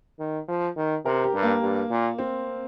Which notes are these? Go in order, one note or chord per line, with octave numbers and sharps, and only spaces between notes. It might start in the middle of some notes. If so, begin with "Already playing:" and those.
D#3
F3
D#3
C3 A#4
G4
G2
A#3
G2
A#2
C4